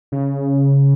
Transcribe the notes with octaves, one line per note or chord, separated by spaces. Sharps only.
C#3